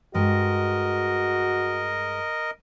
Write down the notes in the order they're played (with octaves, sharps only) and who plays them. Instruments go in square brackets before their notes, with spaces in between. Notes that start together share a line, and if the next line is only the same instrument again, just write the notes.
[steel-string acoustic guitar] G2 G#3 [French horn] F#4 [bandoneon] A#4 D#5